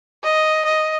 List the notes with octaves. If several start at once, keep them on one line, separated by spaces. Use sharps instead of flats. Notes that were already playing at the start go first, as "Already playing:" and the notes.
D#5
D#5